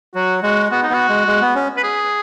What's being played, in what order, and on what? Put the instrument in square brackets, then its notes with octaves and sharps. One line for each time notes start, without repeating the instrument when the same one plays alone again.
[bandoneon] F#3 [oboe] F#4
[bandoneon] G#3 [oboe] F#4
[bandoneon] B3 [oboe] F#4
[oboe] D#4
[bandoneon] B3 [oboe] F#4
[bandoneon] G#3
G#3
B3
C#4
[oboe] B4
G#4